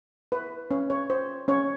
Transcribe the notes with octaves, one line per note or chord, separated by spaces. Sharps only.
B4
C#4 C#5
C#4 C#5
C5
C#4 C#5